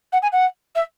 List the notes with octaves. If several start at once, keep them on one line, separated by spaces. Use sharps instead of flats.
F#5
G#5
F#5
E5